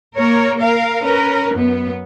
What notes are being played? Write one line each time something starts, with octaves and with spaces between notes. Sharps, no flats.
A#3 A#4 C#5
A#4 F5
C#4 A#4 B4
F#2 B3